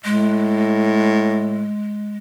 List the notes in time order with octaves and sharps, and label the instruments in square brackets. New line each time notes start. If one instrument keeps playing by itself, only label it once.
[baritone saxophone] A2 [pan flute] G#3